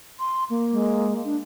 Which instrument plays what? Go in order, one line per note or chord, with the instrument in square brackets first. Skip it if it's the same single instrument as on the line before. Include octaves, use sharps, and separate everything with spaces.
[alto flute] C6
A#3
[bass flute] G#3
D4